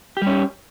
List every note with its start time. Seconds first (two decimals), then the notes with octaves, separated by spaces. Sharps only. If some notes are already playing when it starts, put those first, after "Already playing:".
0.17 G4
0.22 G3
0.27 C#4